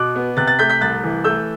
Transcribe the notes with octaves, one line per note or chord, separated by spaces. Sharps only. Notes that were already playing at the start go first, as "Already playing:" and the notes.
Already playing: B2 D6 F#6
B3
C3 F#6 A6
F#6 A6
A3 G6 B6
G6 B6
C2 F#6 A6
E3
A3 E6 G6